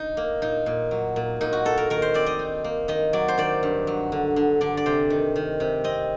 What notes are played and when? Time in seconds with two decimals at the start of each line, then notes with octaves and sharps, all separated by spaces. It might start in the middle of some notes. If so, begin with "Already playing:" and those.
Already playing: D#4
0.17 A#3
0.42 A#2 D#4
0.66 A#2
0.91 F#3
1.16 A#2
1.41 A#2 D#4
1.53 F#4
1.65 D#4 A4
1.77 A#4
1.90 D#3 A#4
2.02 C5
2.14 C4 D5
2.26 D#5
2.39 D#4
2.64 A#3
2.88 D#3 D#5
3.13 F#3 D5
3.28 C5
3.37 D#3 D5
3.63 G2
3.87 F#3
4.12 D3
4.36 D3
4.61 D3 D5
4.77 D5
4.86 C3 C5
5.10 D#3
5.36 D#3
5.60 C3
5.84 C4 D#5